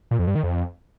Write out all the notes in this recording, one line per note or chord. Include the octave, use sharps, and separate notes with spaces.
A#2
F2
G2
D#3
F2